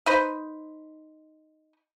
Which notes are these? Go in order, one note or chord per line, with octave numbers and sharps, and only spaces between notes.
D#4 B4 C5